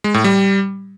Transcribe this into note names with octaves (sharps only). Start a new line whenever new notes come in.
G#3
A2
G3